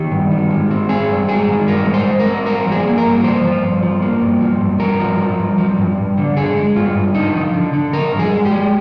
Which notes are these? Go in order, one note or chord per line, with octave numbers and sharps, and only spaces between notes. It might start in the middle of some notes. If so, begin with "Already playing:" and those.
Already playing: D#3 G4
G2
D#3
G#3
C4
C4 G#4
G2
G#3 G#4
D#3
G2 A#4
G#3
C5
G#3
A#4
C4
G2 A#4
F3
G#4
A#3
A#4
G2
F3 C5
F3
G2
F3
A#3
G2
F3
G2
G2 A#4
F3
F3
G2
F3
G2
G2
D3
D3 G#4
G#3
G2 F4
G2
D3 D#4
F3
D3
D3
F3 A#4
G2
G#4
G#3
G4
G#3